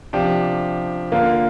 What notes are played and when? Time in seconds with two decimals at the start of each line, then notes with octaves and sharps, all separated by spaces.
0.13 C3 F3 D4 G4
1.12 D3 A#3 F4 A#4